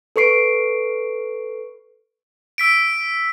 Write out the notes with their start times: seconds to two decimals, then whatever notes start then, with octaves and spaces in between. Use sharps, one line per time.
0.16 A4 B4 C#6 C7 D7
2.58 E6 B6 D7